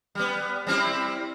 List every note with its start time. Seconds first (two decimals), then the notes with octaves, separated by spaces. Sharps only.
0.15 G3 B3
0.67 G3 C4 E4